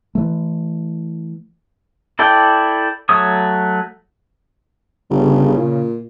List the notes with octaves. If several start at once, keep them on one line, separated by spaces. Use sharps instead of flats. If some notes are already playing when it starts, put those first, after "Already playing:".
E3 A3
E4 A4 D5 G5
F#3 A3 C#5 D#6
G1 C#3
A#2